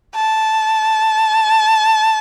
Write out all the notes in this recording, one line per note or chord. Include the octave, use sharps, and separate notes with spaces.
A5